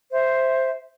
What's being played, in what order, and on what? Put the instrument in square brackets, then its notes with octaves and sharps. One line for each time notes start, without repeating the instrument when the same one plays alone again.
[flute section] C5 E5